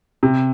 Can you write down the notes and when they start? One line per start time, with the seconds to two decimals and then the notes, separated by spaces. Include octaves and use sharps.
0.23 C3